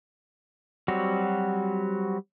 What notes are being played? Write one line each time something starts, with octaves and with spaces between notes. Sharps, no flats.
F#3 G3 C4 F#4